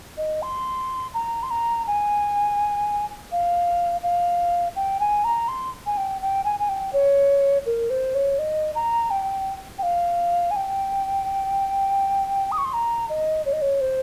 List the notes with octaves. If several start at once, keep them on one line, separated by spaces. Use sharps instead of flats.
D#5
C6
A#5
C6
A#5
G#5
F5
F5
G5
G#5
A#5
C6
G#5
G5
G5
G#5
G#5
G5
C#5
A#4
C5
C#5
D#5
A#5
G5
G5
F5
G#5
G5
D#6
C#6
C6
A#5
D#5
C#5
D#5
C#5
C5